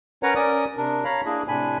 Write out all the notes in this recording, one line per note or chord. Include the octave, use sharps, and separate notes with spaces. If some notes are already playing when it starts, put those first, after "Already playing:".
C#4 A#4 B4 C#5 F#5 A#5
C#4 A#4 D5 D#6
C3 D4 A#4
C#5 F5 A#5 B5
A#3 D4 E4 G#4
A2 C3 D4 G#5 B5